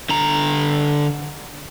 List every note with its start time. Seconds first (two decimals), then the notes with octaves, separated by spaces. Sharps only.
0.09 D3 A#5